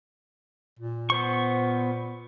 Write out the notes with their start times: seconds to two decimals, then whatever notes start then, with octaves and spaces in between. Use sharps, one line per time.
0.79 A#2
1.10 B3 C5 C#6